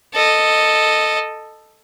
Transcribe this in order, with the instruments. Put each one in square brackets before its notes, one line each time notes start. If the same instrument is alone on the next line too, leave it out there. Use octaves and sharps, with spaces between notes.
[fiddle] A4 D#5